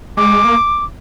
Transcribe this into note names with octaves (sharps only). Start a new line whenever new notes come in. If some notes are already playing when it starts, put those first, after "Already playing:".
G#3 D6
A#3